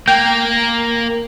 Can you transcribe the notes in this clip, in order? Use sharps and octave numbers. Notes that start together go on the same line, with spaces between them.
A#3 G5